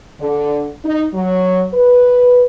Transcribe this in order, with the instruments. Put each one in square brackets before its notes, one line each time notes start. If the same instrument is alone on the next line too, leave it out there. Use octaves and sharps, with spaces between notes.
[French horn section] D3
D#4
F#3
B4